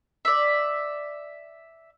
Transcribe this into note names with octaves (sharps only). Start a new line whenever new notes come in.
D5 E5